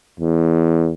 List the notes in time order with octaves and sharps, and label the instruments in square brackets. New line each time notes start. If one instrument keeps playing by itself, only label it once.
[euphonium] E2